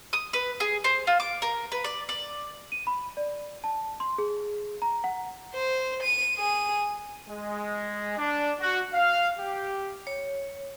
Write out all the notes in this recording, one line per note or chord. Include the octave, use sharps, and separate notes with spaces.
D#6
B4
G#4
C5
F4
D6
A#4
B4
D5
D5
D#7
B5
D5
A5
C6
G#4
A#5
F#5
C5
D#7
G#4 D#7
G#3
D4
F#4
F5
G4
C#5